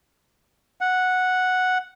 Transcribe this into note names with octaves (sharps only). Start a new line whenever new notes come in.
F#5